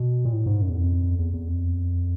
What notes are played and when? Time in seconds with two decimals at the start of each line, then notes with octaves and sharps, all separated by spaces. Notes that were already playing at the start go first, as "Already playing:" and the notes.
Already playing: B2
0.25 A#2
0.32 A2
0.46 G#2
0.61 F#2
0.69 E2
0.76 F2
1.19 E2
1.34 E2
1.48 F2